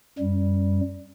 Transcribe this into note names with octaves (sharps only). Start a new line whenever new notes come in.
F#2 G3